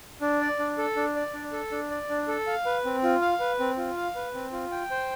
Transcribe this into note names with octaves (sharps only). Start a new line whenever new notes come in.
D4
D5
D4
A4
D4
D5
D4
A4
D4
D5
D4
A4
F5
B4
C4
F4
F5
B4
C4
F4
F5
B4
C4
F4
G5
C5